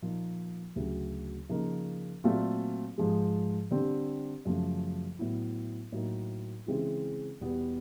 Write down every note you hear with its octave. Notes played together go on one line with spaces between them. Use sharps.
A#2 F3 A#3 D#4
D2 C#3 F#3
C#3 F3 A#3 D#4
A#2 F#3 A3 C4 F4
G#2 F3 G#3
D3 G3 C4
F#2 C#3 F3 A3
A2 F#3 B3 E4
A2 F#3 A#3 D#4
C#3 E3 G#3 C4 E4
E2 B2 G3 B3